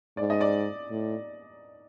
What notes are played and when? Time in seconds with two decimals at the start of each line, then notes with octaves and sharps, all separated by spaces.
0.17 G#2 D5
0.30 D#5
0.41 D5
0.90 A2